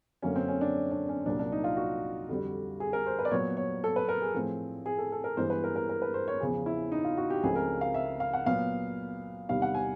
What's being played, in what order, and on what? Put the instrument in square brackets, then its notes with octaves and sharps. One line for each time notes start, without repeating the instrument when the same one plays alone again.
[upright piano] F#2 D3 F#3 A#3 C#4
C4
C#4
D4
D4
C#4
C2 A#2 F#3 D4
D4
D#4
F4
F#4
F2 D3 G3
G#4
A#4
C5
B4
D5
A#2 F#3 B3 C#5
C#5
A4
B4
A#4
G#4
A2 F3 A3 C4
G#4
A4
A4
A#4
G2 E3 G#3 B3 C5
B4
A#4
A#4
A#4
B4
C5
C#5
E2 C#3 F3 G#4
E4
D#4
F4
F#4
G4
C#2 C#3 F3 A3 C4 G#4
A#4
F5
E5
F5
F#5
A#2 F#3 B3 F5
E2 C3 D#3 G3 F5
F#5
G#5